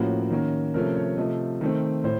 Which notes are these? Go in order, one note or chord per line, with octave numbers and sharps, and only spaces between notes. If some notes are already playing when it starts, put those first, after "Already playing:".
Already playing: A2 F3 A#3 C#4 F#4
D#3 A#3 C#4
C3 F3 A3 C#4 A#4
C#5
C3 F3 A3 D#5
D#3 A3 C4
A2 C5